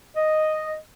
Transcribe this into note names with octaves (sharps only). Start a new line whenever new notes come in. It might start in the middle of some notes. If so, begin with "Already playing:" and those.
D#5